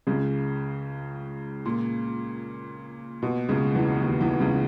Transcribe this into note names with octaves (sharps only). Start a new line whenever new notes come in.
C#2 C#3
A#2
B2
C#2 C#3
E2 E3
D#2 D#3
E2 E3
C#2 C#3